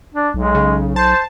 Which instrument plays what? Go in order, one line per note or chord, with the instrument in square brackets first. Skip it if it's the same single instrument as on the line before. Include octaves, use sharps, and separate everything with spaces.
[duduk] D4
[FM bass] B1 [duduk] G#3
[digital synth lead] C#3
[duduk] C5 [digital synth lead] A5